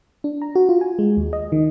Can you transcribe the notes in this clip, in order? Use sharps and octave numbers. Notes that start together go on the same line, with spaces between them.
D4
A#5
F#4
F4
G#5
G#3
D#2
D#5
D#3